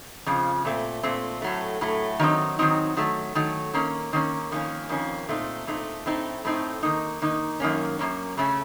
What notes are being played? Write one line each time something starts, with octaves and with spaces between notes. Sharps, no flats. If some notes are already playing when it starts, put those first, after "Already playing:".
F2 C#3 F3
A#2 A3 C4
A#2 A3 C4
A2 F#3 A3
A2 F#3 A3
D#3 F#3 C4 D#4
D#3 F#3 C4 D#4
D#3 F#3 A3
D#3 F#3 A3
D#3 A#3 C#4
D#3 A#3 C#4
F2 D#3 A#3 C#4
F2 D#3 A#3 C#4
A#2 A3 C4 D#4
A#2 A3 C4 D#4
A2 A3 C4 D#4
A2 A3 C4 D#4
D#3 A#3 D#4
D#3 A#3 D#4
F#2 D#3 A#3 C#4
F#2 D#3 A#3 C#4
C#3 A3 C#4